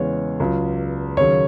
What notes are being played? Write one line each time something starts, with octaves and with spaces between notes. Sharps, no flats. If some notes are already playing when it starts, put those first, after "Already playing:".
Already playing: E2 C#3 G#3 B3 C#5
C#2 C#3 F#3
D#2 C#3 F#3 C#5